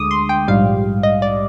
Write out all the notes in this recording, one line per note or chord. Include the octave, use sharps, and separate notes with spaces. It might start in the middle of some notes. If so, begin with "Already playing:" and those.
Already playing: D2 D3 G#3 D6 D#6
C6
G5
A#1 G#2 G3 F5
D#5
D5